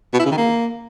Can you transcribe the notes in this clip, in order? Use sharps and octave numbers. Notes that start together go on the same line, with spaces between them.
B2
E4
C#3
D#3
A#3